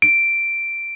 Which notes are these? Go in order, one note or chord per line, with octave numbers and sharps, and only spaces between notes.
D7